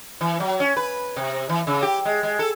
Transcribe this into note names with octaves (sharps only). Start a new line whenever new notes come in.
E3
F#3
C#4
B4
C3
E3
C#3
G4
G#3
G#3
A4